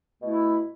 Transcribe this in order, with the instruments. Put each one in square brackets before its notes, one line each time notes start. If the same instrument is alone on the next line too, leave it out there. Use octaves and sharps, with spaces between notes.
[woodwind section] B2 A3 E4